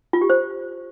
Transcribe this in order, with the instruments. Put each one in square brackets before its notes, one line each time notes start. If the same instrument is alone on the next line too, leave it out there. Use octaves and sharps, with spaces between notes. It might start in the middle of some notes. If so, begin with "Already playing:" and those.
[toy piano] F4
G4
C5